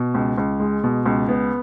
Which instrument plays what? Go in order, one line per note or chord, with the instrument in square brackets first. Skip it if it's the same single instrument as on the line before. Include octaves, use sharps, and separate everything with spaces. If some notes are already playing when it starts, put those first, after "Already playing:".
Already playing: [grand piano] B2
C#2
C#2
G#3
B2
C#2
B3